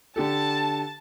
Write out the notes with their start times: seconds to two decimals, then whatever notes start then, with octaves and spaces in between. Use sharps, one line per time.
0.16 D3 G4 A4 A5